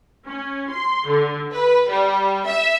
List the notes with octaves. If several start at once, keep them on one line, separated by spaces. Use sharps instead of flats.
C#4
C6
D3
B4
G3
E5